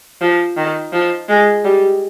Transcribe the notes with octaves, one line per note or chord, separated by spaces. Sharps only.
F3
D#3
F3
G#3
G3